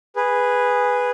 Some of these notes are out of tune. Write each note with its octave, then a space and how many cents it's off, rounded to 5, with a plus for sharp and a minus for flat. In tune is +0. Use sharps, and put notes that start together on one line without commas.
G#4 -10 B4 +0